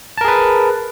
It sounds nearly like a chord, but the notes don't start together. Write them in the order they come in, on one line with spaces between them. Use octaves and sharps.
A5 A#4 G#4 B4